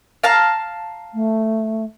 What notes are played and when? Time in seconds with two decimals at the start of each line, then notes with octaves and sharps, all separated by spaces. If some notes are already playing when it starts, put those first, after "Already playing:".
0.24 F5 A5 A#5
1.14 A3